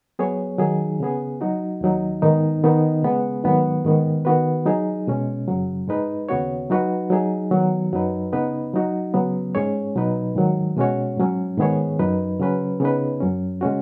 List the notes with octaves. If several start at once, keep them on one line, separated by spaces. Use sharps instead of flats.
F#3 B3 G#4 C#5
D#3 F#3 D#4 G#4
C#3 B3 G#4
F#3 D#4 F#4
D#2 D#3 F#3 D#4
G#2 D#3 B3 D#4
D#3 B3 D#4
C#3 G#3 B3 G#4 B4
G#2 D#3 F#3 B3
G#2 D#3 B3
D#3 B3 F#4 B4
F#3 D#4 G#4
B2 G#3 C#4
F#2 C#3 F#3
G#2 G#3 D#4 B4
D#2 C#3 B3 F#4 C#5
F#3 D#4 F#4 B4
F#3 D#4 G#4
D#3 F#3 B3 F#4
F#2 F#3 D#4 B4
C#3 B3 D#4 B4
F#3 D#4 F#4
C#3 F#3 B3
G#2 G#3 C#4 G#4 C#5
B2 F#3 D#4 B4
G#2 D#3 F#3
B2 G#3 C#4 F#4 C#5
G#2 F#3 C#4
G#2 D#3 B3 G#4 C#5
F#2 F#3 D#4 B4
C#3 F#3 C#4 B4
C#3 B3 D#4 B4
F#2 F#3 C#4
C#3 G#3 C#4 F#4